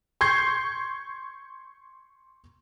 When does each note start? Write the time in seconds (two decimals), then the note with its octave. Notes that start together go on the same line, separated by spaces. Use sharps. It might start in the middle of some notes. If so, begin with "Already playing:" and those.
0.21 C6 C#6 G6 G#6 C7